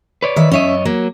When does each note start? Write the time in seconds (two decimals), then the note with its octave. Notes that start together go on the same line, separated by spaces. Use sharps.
0.23 B4 C#5 D5
0.36 D#3 E5
0.52 F#2 C#4 C#5 D#5 E5
0.85 F#3 A#3